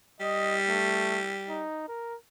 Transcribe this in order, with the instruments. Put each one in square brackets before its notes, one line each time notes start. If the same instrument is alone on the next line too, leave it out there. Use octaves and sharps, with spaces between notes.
[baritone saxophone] G3 [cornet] D#5
[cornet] A3
D#4
A#4